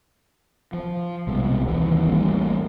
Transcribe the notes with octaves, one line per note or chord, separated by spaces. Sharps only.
F3
C2 B2 G#3
D#2 D#3 E3 C4
A1 G3 A#3 D4